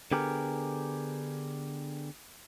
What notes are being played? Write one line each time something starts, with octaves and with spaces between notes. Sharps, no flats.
D3 B3 G4 G#4 A#4